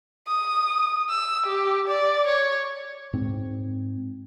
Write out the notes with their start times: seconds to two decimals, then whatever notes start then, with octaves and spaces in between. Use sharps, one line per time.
0.28 D#6
1.09 E6
1.46 G4
1.88 D5
2.27 C#5
3.13 G#2 C4